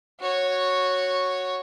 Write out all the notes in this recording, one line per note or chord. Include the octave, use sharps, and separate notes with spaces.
F#4 C#5